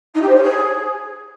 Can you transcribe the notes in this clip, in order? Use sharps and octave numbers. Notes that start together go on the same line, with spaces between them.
D#4
G4
C5
C#5
G#4